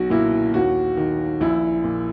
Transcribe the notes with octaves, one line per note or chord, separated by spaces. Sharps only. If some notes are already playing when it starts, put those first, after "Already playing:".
Already playing: B1 F#4
A#2 E4
D#2 F#4
D#3
A#1 E4
A#2